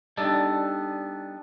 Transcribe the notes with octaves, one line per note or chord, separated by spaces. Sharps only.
G3 B3 D4 D#4 A4